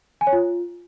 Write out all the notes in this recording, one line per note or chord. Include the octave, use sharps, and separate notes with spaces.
G#5
C#5
F4